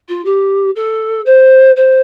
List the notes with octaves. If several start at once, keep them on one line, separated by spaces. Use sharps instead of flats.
F4
G4
A4
C5
C5